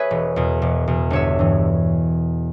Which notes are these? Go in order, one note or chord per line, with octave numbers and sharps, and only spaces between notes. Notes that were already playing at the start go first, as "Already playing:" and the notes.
Already playing: G#4 B4 C#5 E5
E1
E2 B2
E1
E2 B2
G1 C#5 E5
G2 E3